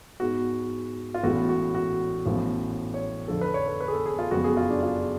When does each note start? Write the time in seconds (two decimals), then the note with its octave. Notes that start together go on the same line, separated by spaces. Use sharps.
0.20 G#2 G#3 B3 F#4
1.14 F4
1.23 A1 A2 G#3 B3 F#4
1.49 F#4
1.75 F#4
2.26 A1 A2 F3 B3
2.94 C#5
3.28 F2 D3 F3 A4
3.41 B4
3.54 C#5
3.68 B4
3.80 B4
3.88 G#4
3.93 A4
4.06 G#4
4.19 F4
4.31 F#1 F2 F3 B3 F#4
4.44 G#4
4.57 F4
4.70 D4
4.83 F4